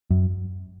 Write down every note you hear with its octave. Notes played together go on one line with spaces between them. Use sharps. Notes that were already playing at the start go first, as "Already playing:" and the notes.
F#2